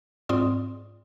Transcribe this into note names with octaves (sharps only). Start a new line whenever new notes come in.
G#2 C4 F4 D5 C6 D#6